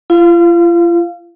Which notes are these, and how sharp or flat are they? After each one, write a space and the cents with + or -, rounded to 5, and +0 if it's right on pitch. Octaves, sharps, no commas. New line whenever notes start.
F4 -40 F5 +0